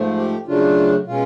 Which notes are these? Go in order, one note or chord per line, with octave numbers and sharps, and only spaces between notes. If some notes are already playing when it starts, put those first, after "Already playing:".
Already playing: G#2 F3 A3
G4
F#2 C#3 F#3 A3 D4 F4
B2 G#3 C#4 F4